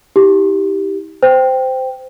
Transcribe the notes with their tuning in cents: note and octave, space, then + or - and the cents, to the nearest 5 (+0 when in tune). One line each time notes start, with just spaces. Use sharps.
E4 -45 G4 -5
C5 -15 G5 +0